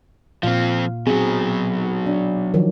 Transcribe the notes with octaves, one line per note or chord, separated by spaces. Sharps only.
A#2 F3 C4 F5
B2 F#3 C4 G#4
D4
D#3 F3 F#3